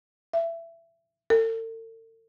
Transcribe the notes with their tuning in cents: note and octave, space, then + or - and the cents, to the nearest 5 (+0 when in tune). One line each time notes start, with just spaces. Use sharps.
E5 +20
A4 +45